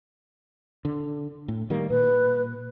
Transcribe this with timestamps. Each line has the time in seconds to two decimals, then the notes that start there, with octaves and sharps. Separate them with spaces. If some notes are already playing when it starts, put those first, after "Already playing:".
0.85 D3
1.48 A2
1.70 D#3 G3 A#3
1.90 A#2 B4